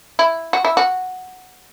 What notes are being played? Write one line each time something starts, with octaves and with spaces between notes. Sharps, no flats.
E4
F#4
E4
F#4